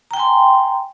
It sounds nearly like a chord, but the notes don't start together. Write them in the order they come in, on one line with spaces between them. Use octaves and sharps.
A#5 G5 G#5 C6